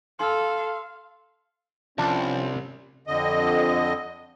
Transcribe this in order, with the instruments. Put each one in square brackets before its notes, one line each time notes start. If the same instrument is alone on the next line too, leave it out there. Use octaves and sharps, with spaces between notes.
[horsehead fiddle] A4 [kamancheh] F5 [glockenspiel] C6 F6
[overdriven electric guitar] C2 [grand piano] F3 [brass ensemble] C#4 [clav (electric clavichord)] D4
[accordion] F2 D3 D#5